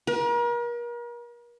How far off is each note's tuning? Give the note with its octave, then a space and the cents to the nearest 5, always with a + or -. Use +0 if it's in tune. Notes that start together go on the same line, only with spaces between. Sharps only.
A#4 +40